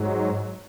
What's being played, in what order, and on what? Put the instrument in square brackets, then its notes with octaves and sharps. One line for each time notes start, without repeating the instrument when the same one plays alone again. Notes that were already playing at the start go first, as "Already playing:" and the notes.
Already playing: [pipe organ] G#2 F#3